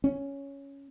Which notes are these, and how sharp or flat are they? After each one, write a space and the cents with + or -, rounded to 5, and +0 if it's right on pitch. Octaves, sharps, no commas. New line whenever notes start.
C#4 +5